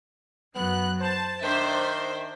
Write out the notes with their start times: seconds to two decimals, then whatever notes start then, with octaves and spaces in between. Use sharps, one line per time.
0.55 F#2 F#3 B3 F#6
1.01 C5 A5
1.43 D#3 D4 C5 E5